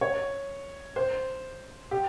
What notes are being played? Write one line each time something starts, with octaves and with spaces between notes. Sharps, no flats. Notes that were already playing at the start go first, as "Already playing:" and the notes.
C#5
C5
G4